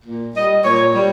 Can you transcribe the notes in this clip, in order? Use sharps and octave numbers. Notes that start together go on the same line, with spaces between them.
A#2
G3 D#5
A#2 C#5
G3